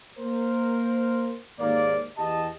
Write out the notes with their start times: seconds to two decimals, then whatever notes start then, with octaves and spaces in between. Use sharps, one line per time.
0.18 A#3 A#4 C5
1.60 D#2 G#2 A#3 D5
2.18 E2 G4 D#5 A5